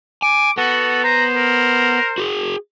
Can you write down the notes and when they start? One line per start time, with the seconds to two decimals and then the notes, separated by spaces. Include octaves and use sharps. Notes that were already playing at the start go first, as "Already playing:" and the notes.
0.22 G#5 D6
0.58 B3 F#4 A4
1.04 C5 A#5
1.35 A#4
2.18 F#4 G#4